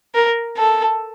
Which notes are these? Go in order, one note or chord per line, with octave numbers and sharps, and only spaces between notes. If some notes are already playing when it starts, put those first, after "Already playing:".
A#4
A4